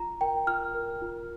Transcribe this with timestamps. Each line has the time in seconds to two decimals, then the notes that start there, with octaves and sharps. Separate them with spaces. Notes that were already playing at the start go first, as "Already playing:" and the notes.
Already playing: F4 A#5
0.21 A#4 G5
0.47 F4 F6
0.75 A#4
1.02 F4